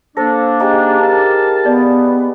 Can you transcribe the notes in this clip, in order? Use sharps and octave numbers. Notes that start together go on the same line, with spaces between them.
A#3 D4 A4 C5 A#6
D#4 G4 G#4
A#4 F5 A5
B3 D5